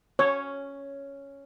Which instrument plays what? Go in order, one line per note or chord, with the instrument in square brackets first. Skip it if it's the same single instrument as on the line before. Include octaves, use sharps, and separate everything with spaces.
[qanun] C#4 [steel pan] C#5